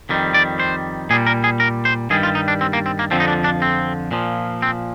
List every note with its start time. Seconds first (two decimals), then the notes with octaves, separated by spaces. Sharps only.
0.09 F2 D#3 G3
0.34 D5
0.60 C5
1.10 A#2 G3 G#4
1.27 A#4
1.44 G#4
1.60 A#4
1.85 C5
2.10 G2 D#3 G3 G#4
2.23 F4
2.35 D#4
2.48 D4
2.61 C4
2.73 A#3
2.86 C4
2.99 A#3
3.11 F2 D3 F3 C4
3.20 D#4
3.28 D4
3.44 D4
3.62 C4
4.11 A#2 F3
4.62 C4